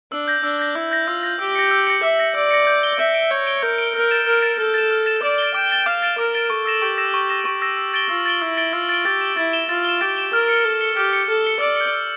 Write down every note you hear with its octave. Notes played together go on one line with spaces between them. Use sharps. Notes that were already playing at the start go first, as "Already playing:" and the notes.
D4 E6
G6 A#6
D4 E6
G6 A#6
E4 E6
G6 A#6
F4 E6
G6 A#6
G4 E6
A#6 C#7
E6
A#6 C#7
E5 E6
A#6 C#7
D5 E6
A#6 C#7
G6
D7 G7
E5 G6
D7 G7
C#5 G6
D7 G7
A#4 G6
D7 G7
A#4 F6
A6 E7
A#4 F6
A6 E7
A4 F6
A6 E7
F6
A6 E7
D5 D6
A6 D7 G7
G5 D6
A6 D7 G7
F5 D6
A6 D7 G7
A#4 D6
A6 D7 G7
A4 C#6
E6 A#6 E7
G4 C#6
E6 A#6 E7
C#6
E6 A#6 E7
G4 C#6
E6 A#6 E7
E6
A6 D7 G7
F4 E6
A6 D7 G7
E4 E6
A6 D7 G7
F4 E6
A6 D7 G7
G4 A6
E7 G7
E4 A6
E7 G7
F4 A6
E7 G7
G4 A6
E7 G7
A#4 F6
C#7 G7
A4 F6
C#7 G7
G4 F6
C#7 G7
A4 F6
C#7 G7
D5 E6
G6 C#7
E6